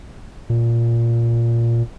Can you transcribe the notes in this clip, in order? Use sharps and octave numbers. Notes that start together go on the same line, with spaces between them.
A#2